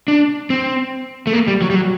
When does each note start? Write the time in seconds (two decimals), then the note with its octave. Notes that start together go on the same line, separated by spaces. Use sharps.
0.08 D4
0.50 C4
1.27 A3
1.33 A#3
1.48 G3
1.62 F#3
1.70 G3
1.75 F#3